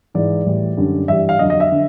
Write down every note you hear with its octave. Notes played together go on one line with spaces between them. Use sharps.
G#2 E3 G#3 D5
A2 E3 G3
F#2 D3 G3
G2 E3 G3 E5
F5
F2 D3 F#3 D#5
D#5
E5
D3